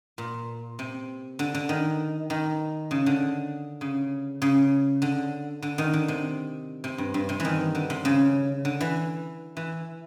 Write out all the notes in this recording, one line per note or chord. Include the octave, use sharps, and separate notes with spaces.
A#2
C3
D3
D3
D#3
D#3
C#3
D3
C#3
C#3
D3
D3
D#3
D3
C3
C3
G2
G2
C3
E3
D#3
D3
C3
C#3
D3
E3
E3